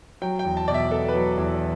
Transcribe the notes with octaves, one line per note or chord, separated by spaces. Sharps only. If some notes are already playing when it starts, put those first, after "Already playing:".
F#3 G5
G5
E2
A5
B2 D5
E5
B3 A4
B4
F#3
E2